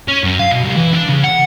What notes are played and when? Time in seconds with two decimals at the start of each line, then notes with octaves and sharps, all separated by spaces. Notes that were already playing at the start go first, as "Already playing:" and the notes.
0.08 C#4
0.24 F#2
0.39 F5
0.51 B2
0.64 C2
0.76 E3
0.93 D4
1.08 C#3
1.23 F#5